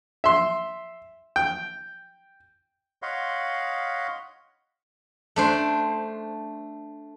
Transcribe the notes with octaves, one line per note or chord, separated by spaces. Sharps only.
E5 C6
G5
C#5 D#5 F5 F#5 B5 C6
A3 D4 C5